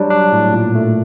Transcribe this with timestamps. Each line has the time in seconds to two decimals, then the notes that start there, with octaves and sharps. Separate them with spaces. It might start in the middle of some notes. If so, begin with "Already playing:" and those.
Already playing: F#3 G3 D4
0.10 D4
0.32 A2
0.53 A#2
0.75 A3